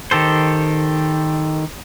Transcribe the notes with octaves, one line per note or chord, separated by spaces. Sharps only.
D#3 G4 A4 C5